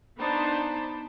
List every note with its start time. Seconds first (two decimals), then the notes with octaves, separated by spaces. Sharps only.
0.18 B3 D4 D#4 C5 A5 B5